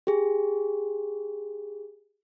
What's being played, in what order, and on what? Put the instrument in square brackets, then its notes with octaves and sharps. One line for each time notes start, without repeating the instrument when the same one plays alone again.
[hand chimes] G4 G#4